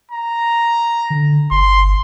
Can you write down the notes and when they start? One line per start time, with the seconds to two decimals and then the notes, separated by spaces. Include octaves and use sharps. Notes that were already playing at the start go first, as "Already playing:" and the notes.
0.11 A#5
1.10 D3
1.51 G1 C6